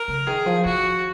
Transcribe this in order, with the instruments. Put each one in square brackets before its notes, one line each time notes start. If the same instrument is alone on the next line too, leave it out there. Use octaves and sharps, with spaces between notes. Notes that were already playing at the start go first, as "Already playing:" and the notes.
Already playing: [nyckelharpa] A#4
[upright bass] C#3
[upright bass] D#3 [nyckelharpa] G#4
[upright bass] F3
[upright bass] D#3 [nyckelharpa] F#4